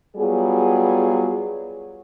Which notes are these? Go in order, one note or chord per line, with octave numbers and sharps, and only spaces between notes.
F#3 G3 B3 F4 G#4